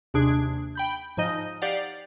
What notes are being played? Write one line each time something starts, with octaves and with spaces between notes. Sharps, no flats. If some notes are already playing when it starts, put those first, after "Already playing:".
D#2 C3 D4 G#4 F#6
G5 B5 G6
G#2 F3 D#4 D#5 D#7
G4 D5 F5 F#5